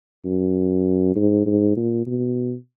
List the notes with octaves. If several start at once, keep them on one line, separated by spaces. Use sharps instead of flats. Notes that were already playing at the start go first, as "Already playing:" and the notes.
F#2
G#2
G#2
A#2
B2